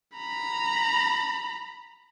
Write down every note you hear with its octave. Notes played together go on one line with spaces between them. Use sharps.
A#5 B5